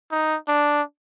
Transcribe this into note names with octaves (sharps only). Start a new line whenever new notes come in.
D#4
D4